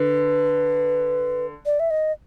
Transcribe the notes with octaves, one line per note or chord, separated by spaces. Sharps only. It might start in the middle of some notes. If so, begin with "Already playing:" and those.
Already playing: D3 B4
D5
E5
D#5